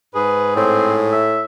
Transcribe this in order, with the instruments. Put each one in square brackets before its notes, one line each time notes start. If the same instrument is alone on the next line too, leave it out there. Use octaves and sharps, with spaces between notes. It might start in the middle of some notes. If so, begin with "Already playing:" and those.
[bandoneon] G#2 G#4 [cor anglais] B4
[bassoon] A2 [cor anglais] C4
[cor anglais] E5